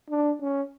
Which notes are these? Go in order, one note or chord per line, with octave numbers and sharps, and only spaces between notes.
D4
C#4